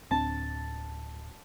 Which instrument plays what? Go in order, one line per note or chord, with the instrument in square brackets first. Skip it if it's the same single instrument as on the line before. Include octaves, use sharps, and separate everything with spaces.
[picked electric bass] D1 C4 D4 [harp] A5